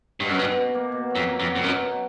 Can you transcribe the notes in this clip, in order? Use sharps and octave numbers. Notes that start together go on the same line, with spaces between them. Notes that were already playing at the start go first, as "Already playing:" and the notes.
G2 B2
F#2
G2 B2
B2
A#3
B2
F#3
F2
A#3
F2
F#3
F2
F#2 B2
B2